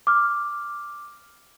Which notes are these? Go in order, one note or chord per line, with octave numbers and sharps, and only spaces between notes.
D6 F6